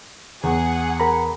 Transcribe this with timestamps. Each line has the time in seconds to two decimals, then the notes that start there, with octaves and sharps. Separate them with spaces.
0.43 E2 G#4 F#5
1.00 A#4 A#5 B5